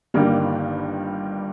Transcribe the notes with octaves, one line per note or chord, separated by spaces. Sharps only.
G1 G2 D#3 G3 A#3